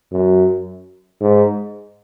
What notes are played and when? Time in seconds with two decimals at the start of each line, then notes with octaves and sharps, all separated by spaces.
0.12 F#2
1.21 G#2